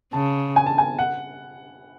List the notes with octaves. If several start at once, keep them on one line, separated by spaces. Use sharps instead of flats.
C#3 A5
G#5
A5
G#5
F#5